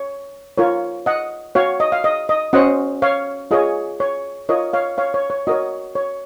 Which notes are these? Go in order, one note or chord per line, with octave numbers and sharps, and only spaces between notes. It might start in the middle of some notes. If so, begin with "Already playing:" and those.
Already playing: C#5
F4 A#4 C#5
D#5 F#5
F#4 C#5 F5
D#5
F5
D#5
D#5
C#4 F#4 C5 D#5 F#5
C#5 F5
F4 G#4 C#5 D#5
C#5
F4 A#4 C#5 D#5
C#5 F5
C#5 F5
C#5
C#5
F#4 A#4 C#5 D#5
C#5